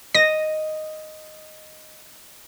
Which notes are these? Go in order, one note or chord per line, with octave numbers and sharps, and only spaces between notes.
D#5 A#6